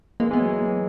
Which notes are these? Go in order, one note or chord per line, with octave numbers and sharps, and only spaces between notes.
E3 G#3 A#3
E3 G#3
B3
F#3